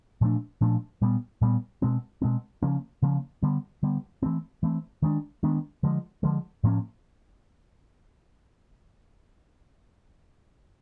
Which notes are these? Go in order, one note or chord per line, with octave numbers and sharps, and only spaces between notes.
A#2 F3 A3 D4
A#2 F3 A3 D4
A#2 G3 B3
A#2 G3 B3
B2 G#3 C4
B2 G#3 C4
C#3 F3 A#3 C#4
C#3 F3 A#3 C#4
D3 G3 B3
D3 G3 B3
E3 A3 C4
E3 A3 C4
D#3 G#3 B3 D4
D#3 G#3 B3 D4
D3 F3 G#3
D3 F3 G#3
A2 F3 A#3 C#4